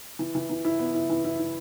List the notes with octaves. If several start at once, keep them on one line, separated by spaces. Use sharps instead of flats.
E3
E3
E3
E4
B3
E4
E3
E4
E4